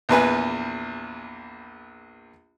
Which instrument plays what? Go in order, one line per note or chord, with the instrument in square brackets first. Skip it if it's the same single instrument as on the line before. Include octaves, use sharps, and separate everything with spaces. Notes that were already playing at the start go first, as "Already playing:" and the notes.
[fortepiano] A#1 E2 B4 G#5